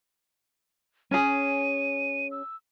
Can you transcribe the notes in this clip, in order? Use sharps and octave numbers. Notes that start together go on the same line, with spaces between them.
C#4 G#4 D#7
E6